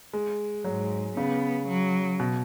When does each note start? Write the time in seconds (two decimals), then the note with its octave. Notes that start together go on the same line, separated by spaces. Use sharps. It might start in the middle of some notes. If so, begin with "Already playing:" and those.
0.13 G#3
0.65 G#2 F#3
1.17 C#3 B3
1.68 F#3
2.20 B2